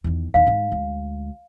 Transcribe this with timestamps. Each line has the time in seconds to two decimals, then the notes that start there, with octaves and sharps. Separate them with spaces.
0.04 E2 D#3
0.34 E2 D#3 F5
0.47 G#2 G#3
0.72 D2 G#3